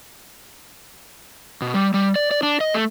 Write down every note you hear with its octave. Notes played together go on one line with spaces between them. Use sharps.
B2
G3
G3
D5
D5
D4
D#5
A3